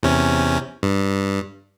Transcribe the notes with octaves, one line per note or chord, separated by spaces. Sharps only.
E2 C3 C#4
G2